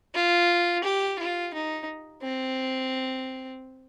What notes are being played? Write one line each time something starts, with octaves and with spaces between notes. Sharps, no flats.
F4
G4
F4
D#4
C4